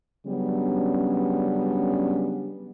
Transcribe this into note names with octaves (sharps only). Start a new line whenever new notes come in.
C#3 F#3 G3 B3 C#4 D4